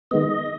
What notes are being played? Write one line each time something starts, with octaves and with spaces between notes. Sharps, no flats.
D#3 G#3 B3 D#5